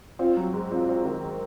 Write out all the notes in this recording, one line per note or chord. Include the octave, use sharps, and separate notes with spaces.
C4 F4
F#3
G#2
C4 F4
C4
D#3